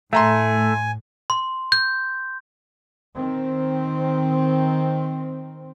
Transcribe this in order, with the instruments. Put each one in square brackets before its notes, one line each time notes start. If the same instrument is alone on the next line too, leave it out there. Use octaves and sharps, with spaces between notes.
[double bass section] A2 [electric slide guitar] A3 [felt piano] E5 A#5 C6 [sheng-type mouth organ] G#5
[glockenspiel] C6
G6
[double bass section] D#3 C4